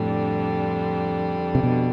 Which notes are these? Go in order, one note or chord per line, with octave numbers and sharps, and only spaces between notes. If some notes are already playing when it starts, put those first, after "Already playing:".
Already playing: F2 A2 D3 G3 D4
C3
B2